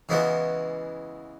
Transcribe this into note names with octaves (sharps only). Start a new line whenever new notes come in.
C#3 E3 G#3 B3 F#4